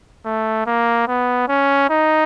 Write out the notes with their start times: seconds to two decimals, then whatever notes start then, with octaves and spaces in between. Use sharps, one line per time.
0.25 A3
0.66 A#3
1.08 B3
1.48 C#4
1.90 D#4